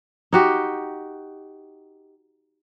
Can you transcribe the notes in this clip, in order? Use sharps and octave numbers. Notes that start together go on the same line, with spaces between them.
D#4 F#4 G4